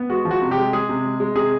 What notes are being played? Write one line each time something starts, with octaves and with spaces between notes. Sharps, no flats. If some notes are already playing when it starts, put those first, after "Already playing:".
Already playing: B3
G#3 F#4
F3
F#4
C3
G4
G#3
G#3 G#4
C3
G#3
G#3
C3 G#4